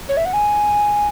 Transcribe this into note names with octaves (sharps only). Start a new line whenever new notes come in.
C#5
E5
F#5
G#5